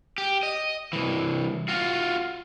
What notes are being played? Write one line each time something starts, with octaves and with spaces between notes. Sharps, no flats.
G4
D#5
C2 E3
F4 F#4